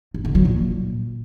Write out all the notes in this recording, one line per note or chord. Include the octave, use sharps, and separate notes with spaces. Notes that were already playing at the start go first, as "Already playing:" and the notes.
G2
D3
F#3
A#2